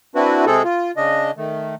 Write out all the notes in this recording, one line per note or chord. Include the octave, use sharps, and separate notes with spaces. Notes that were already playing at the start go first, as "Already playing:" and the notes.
C4 D4 E4 F#4 B4
C3 G#3 C4 G#4 A4
F4
C#3 D4 D#5
D#3 A3